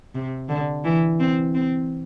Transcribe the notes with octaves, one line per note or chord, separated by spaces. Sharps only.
C3
D3
E3
C4
C4